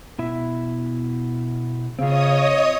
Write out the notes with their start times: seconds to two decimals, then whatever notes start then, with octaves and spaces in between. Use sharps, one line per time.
0.18 B2 E4 E5
1.99 C#3 C4 F4 C#5 D#5 D#6